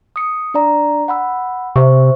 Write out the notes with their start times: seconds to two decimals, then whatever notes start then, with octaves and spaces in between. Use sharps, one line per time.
0.16 D#6 C#7
0.54 D4 D5 A#5
1.08 F#5 B5 E6
1.76 C3 C5 E5 C#6